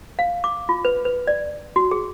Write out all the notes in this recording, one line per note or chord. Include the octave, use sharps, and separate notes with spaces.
F5
D6
F4
B4
B4
D5
F#4
G#4